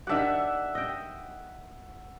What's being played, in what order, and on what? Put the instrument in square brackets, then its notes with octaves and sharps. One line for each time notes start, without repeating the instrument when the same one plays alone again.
[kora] D#3 D4 G4 [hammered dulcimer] E5 F#5
[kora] D#5 G5